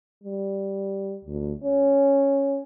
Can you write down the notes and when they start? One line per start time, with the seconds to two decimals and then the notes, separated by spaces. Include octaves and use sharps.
0.24 G3
1.25 D2
1.64 C#4